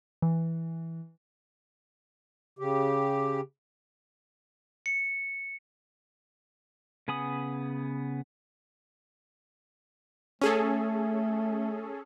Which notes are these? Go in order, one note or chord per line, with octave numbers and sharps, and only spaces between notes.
E3
C#3 G4
C#7
C#3 B3 G#5 B5 D#6
A3 C#4 G#4 A4